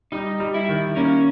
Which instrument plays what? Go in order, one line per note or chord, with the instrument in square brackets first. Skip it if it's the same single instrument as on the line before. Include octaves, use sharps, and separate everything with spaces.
[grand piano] G3 [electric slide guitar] D#4
[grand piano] G3
[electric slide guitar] E4
[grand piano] D#3
[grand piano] A#3 [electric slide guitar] C#4